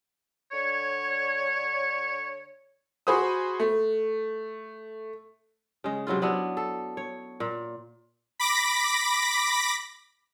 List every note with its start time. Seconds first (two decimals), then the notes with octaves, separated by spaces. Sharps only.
0.52 D3 C#5
3.07 F#4 G#4 C5 B5 D#6
3.60 A3
5.84 C#3 G#3
6.07 C3 F#3 E4 F4
6.22 F#3 B3 D4 E4
6.57 A4
6.97 C#5
7.40 A#2
8.40 B5 D6 A#6 B6